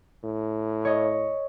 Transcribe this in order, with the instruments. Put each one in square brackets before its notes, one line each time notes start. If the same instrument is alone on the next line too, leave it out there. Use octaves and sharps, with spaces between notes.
[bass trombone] A2
[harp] C#5 D#5